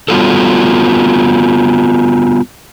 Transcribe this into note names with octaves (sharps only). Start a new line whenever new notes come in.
G3 B3 F4 F#4 A4